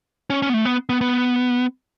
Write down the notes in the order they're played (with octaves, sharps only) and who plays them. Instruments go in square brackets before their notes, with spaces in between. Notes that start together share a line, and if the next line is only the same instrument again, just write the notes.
[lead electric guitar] C#4
C#4
B3
A3
B3
B3
B3